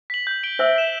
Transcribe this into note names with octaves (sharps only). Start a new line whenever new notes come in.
B6 F#7
G6
D7 G7
C5 E5 E6
B6 E7